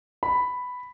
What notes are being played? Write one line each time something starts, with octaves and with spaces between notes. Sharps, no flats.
B5